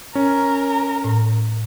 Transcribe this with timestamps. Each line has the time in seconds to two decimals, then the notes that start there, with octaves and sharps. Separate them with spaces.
0.15 C#4 A#4
1.04 A2